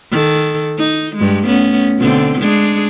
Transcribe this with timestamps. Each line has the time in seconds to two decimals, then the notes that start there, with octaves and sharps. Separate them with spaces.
0.11 D#3 A4
0.78 D#4
1.16 G2 G#3
1.46 A3 B3 C#4
1.98 B2 D3 C4
2.40 G#3 D4 G#4